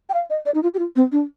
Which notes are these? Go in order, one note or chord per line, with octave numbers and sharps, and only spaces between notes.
G5
F5
D#5
D5
D#4
F4
G4
F4
C4
D4